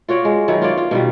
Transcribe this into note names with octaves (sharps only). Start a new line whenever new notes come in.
F4 F#4 C#5 D5
G#3
D#3 F#3 B3 E4
F4 C#5 D5
F4
B2 D#3 G3